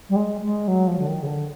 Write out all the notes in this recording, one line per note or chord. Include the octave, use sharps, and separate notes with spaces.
G3
G#3
G#3
F#3
F3
D3
D#3
C#3
D3